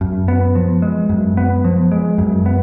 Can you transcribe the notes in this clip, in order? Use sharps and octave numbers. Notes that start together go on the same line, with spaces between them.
F#2
B3
F3
G#3
F#2
B3
F3
G#3
F#2
B3